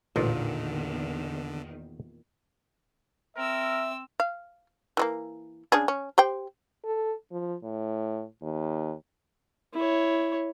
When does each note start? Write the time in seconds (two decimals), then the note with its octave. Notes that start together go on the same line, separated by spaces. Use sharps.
0.16 A1 E2 A#2 D3 D#3 D#4 F4
3.37 C4 A#4 E5 E6
4.20 F5
4.97 E3 G#3 A#3
5.72 C#3 D4 G#4
5.88 C#4
6.18 G4 C5 G5
6.84 A4
7.32 F3
7.63 A2
8.42 D#2
9.74 E4 C#5